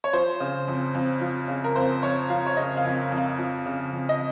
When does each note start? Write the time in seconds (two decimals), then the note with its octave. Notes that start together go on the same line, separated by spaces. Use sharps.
0.04 C#5
0.13 F3 C5
0.40 C#3
0.68 F2
0.95 F2
1.21 F3
1.48 C#3
1.64 A#4
1.76 F2 C5
2.03 F2 C#5
2.30 F3 F5
2.47 C#5
2.57 C#3 D#5
2.77 F5
2.84 F2
3.12 F2
3.18 F5
3.39 F3
3.66 C#3
3.93 F2
4.09 D#5